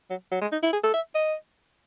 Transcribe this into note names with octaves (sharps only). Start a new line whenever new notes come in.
F#3
F#3
G#3
D#4
E4
G#4
A4
E5
D#5